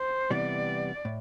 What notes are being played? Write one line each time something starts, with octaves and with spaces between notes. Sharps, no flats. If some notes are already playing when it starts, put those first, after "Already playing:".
Already playing: C5
C3 E3 G3 B3 D5
A2